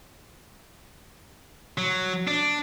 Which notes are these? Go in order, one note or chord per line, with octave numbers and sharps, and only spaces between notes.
F#3
D4